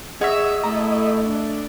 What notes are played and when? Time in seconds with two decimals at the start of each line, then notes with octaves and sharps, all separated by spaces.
0.21 F#4 G#4 C#5 D#5 E5
0.64 A3 E4 A4 A#5
1.24 D4